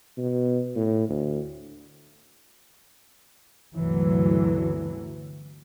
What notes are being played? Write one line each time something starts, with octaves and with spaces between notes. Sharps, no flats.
B2
A2
D2
G1 D2 C3 E3 F#3